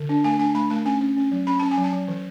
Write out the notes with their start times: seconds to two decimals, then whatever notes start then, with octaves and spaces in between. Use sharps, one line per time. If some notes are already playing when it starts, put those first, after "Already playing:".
Already playing: D3
0.09 D4
0.24 A3 G#5
0.39 D4 G#5
0.55 A3 B5
0.70 A3 A5
0.85 C#4 G#5
1.01 C#4
1.17 C#4
1.32 F#3
1.47 C#4 B5
1.59 C#4 A5
1.71 G#5
1.78 F#3
1.84 A5
1.93 F#3
2.08 E3